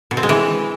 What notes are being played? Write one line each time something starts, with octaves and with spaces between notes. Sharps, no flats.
B2
C4
G#3
E3